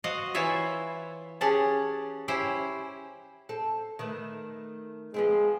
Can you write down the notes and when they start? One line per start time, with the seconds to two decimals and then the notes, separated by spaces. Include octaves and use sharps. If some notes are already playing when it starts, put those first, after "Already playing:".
0.04 F#4 C5 D#5 F5 F#5
0.35 E3 E4 F4 C5 C#5 E5
1.41 C#4 G4 G#4 F#5 A5
2.28 C#4 E4 G4 C5 G5
3.49 C4 A4
3.99 D#3 A3 B4
5.14 F3 G#3 B3 C4